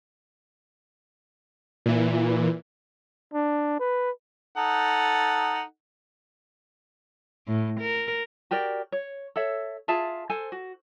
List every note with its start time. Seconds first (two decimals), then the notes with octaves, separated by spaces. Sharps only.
1.86 A#2 E3
3.34 D4
3.79 B4
4.57 D#4 A4 F#5
7.48 A2
7.81 A#4
8.51 F#4 G4 A#4 D5
8.92 C#5
9.36 A4 C#5 E5
9.88 F4 G#4 E5 A5
10.30 A4 C5 G#5
10.52 F#4